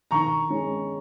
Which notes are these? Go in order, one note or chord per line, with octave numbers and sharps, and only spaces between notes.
D#3 A#5 C#6
G#3 C#4